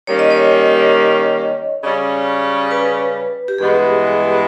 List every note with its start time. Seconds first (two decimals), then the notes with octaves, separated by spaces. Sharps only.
0.07 D#3 G3 A#3 C#4 C#5
0.19 D#5
0.31 C#5
1.83 C#3 G3 C#4
2.71 B4
3.48 G4
3.58 G2 E3 G#3 B3 G#4